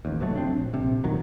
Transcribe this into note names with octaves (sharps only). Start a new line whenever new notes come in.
A1 D#2
F1 F3 F#3 A3
C4 D4
A#1
A#1 C3
D#1 A#1 D#3 F#3